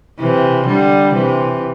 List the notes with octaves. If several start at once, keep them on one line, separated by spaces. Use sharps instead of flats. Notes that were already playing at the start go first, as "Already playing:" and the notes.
C3 E3
D3 G3
C3 E3